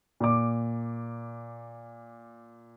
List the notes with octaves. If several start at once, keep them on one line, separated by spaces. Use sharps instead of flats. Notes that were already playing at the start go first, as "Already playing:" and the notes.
A#2 D6